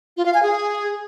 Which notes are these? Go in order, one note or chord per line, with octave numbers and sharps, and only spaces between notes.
F4
F5
G#5
G#4